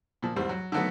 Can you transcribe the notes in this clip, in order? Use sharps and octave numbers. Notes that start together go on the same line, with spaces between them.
A#2 F3
E2 G#2 G3 C4
F#3
D3 D#3 F#3 A3 B3